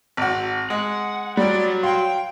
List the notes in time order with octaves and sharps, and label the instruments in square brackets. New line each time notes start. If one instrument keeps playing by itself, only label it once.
[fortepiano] G#1 F#4
[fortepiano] G#3 [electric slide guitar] F#5
[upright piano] G3 [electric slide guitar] F#4 C#5 [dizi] D5
[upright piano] F5 [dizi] G5 [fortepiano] C6